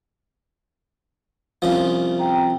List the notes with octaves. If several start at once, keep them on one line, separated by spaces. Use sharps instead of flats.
C2 C#3 F3
C4 G5 A#5